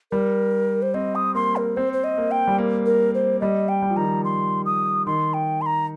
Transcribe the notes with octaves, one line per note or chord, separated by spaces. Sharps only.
G3 A#4
C5
C4 D#5
D#6
A#3 C6
A#4
C4 C5
C5
D#5
A#3
G5
G3
A#3
A#4
C5
G3 D#5
G5
G3
F3
D#3 A#5
F3
C6
D#6
D#3 C6
G5
C6
A#5